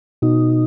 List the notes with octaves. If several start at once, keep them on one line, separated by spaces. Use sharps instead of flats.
B2 D#4